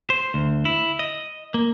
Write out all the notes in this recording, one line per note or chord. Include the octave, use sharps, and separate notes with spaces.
C5
D2
E4
D#5
A#3